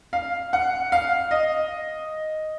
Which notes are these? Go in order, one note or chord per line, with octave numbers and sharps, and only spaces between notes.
F5
F#5
F5
D#5